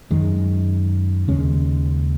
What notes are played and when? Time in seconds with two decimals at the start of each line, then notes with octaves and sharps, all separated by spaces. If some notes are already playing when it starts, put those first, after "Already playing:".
0.11 F#2 D#3 G#3
1.28 D#2 C#3 G#3 C#4